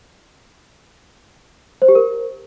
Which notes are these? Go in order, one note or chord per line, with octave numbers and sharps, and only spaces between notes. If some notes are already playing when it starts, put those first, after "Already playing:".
C5
G4
A#4